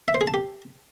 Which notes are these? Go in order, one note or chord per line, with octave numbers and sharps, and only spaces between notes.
E5
C5
G#4
A5
G4